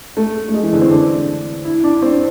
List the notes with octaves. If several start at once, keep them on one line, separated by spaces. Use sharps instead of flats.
A3
A3
G#3
E3
D3
C4
D4
E4
D4
C4